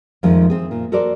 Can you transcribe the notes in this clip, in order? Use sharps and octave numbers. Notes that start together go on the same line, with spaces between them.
F2 D#3 F3 G#3 A3
C4 G#4
A#2
F#4 A4 A#4 C5 D5